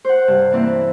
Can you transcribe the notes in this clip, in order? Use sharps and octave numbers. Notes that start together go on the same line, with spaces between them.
C5 F#5
G2 C3
E3 A#3 C4 E4